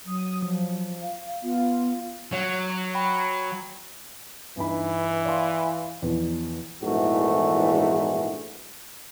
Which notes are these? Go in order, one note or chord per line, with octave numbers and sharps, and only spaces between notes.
F#3 D#6
F3
F5
B3 F4
F#3 C#5
C#6
G5 B5 C#7
G2 E3 D#4 B5
D5 F5 C6
E2 B2 F3
A#1 E2 G#2 E3 A3 F#4